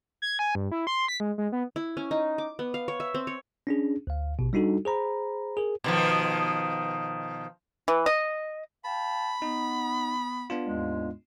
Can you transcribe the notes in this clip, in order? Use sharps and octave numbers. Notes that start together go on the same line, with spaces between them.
G#6
G#5
G2
E4
C6
B6
G#3
G#3
B3
E4
C#4
D#4
D6
B3
F5
C#5
E5
C4
C#5
C#4 D4 G#4
D2 F5
A1 B2
G3 D4 D#4 F#4 A4
G#4 C5 A#5 B5
G#4 A#4
B2 D#3 F3
E3
D#5
F5 G5 A5 B5
B3 D#4
B3 D4 F4
D#2 G#2 G#3